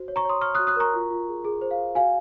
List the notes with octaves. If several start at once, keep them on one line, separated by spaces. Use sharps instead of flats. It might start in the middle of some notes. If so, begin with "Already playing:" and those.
Already playing: F#4 C5
C#5
A#5 C#6
C#5 C6 D#6
C#5 C#6 F6
F#4 D#6 F#6
D#6 F#6
A#4 A#5 C#6
F4
F4
G#4
G#4
C5
F5
G#4
F#4 F5 G#5